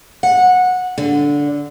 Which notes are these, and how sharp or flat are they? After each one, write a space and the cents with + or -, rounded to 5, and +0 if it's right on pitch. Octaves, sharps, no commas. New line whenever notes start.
F#5 -15
D3 -10